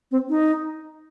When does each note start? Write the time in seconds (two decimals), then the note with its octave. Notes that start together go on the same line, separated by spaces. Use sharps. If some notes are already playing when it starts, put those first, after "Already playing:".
0.11 C4
0.29 D#4